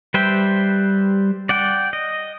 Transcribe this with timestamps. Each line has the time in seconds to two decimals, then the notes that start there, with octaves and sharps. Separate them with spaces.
0.14 G3 B4 C5 E5 G5
1.49 D5 F#5 G5
1.93 D#5